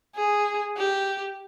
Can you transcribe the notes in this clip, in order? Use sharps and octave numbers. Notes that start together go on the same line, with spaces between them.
G#4
G4